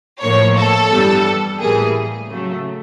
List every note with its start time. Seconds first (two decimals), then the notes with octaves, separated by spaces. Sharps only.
0.22 A2 F3 A#3 C#5
0.56 A4
0.90 G2 E3 G3 B3
1.59 A2 E3 G3 A#3 G#4
2.28 C#3 F#3 A3